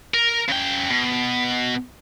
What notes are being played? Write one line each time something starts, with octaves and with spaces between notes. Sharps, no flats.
A#4
C#3 G5
B2